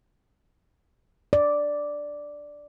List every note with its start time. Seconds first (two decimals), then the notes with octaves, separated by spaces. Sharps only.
1.33 D5